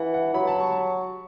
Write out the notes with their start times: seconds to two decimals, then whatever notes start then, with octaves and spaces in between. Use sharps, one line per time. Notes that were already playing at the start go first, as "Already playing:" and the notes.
Already playing: E3 F#5
0.14 F#5
0.34 F#3 B5
0.47 A5
0.60 C#6